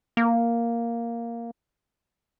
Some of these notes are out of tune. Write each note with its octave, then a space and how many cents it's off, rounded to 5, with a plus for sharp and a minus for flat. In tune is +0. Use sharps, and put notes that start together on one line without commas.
A#3 +0